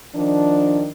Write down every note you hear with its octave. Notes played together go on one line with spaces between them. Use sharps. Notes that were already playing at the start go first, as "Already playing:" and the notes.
D#3 F3 D4